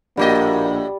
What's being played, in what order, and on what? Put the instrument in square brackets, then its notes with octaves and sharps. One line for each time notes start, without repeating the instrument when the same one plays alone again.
[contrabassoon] A#1 [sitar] A2 F#4 D#5 [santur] G3 [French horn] A#3